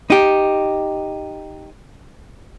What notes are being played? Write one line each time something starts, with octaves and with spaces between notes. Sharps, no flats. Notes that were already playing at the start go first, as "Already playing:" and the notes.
D#4 G4